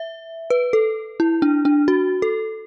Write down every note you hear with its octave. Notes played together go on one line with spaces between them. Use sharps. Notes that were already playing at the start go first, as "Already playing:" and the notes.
Already playing: E5
B4
A4
E4
D4
D4
F#4
A4